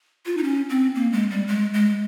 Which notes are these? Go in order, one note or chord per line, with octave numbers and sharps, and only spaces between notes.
F4
D#4
C#4
C4
A#3
G#3
G3
G#3
G#3